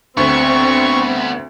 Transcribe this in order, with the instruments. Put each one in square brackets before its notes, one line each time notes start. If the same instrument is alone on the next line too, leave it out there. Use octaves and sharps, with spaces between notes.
[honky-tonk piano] D2 [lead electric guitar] B3 D4 [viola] C4 [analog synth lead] C#6